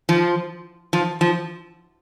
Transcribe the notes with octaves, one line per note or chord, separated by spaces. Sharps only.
F3
F3
F3